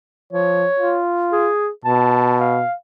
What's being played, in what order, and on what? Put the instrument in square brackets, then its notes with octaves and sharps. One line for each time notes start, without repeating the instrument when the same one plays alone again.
[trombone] F3 [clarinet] C#5
[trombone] F4
[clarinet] G#4
[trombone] B2 [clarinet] A5
[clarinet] F5